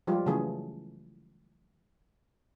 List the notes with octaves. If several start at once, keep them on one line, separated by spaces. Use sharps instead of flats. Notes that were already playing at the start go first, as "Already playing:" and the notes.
F3 G3 G#3 F4 G4
C#3 E3 F#3 A3 G#4